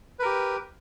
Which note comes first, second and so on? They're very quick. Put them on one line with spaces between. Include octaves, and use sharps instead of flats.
B4 A#4 G4